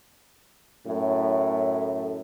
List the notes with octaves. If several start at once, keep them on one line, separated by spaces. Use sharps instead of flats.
F#2 A2